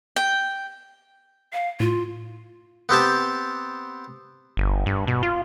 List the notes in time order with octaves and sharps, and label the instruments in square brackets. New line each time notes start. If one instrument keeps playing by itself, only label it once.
[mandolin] G5
[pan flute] F5
[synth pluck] A2 [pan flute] F4
[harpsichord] B3 C4 G4 A5
[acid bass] G1
G2
B2
F4